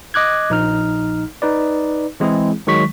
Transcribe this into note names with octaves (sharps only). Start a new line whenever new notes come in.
D#5 D6 F#6 G#6
A#1 D#4 F6
D#4 B4 D5
E3 G#3 C4 E4 G#4
D#3 F#3 G#3 C#6 B6